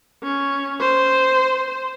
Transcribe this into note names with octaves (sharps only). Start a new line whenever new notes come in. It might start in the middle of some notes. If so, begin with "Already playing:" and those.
C#4
C5